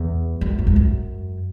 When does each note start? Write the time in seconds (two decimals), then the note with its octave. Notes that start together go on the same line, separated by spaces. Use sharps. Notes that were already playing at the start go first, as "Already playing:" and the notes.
Already playing: E2
0.41 F#2
0.59 G#2
0.67 E2
0.76 F#2